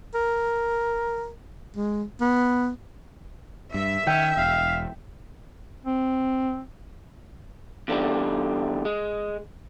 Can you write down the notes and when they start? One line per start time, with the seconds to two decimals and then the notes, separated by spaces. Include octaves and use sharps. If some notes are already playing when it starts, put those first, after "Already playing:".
0.14 A#4
1.76 G#3
2.20 B3
3.74 G2 E5
4.07 D#3 C#4 G5
4.37 E1 F5
5.85 C4
7.88 E2 D3 G3
8.85 G#3